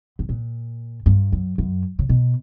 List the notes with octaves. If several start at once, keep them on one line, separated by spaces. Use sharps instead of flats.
G2
A#2
G2
F#2
F#2
C#3
B2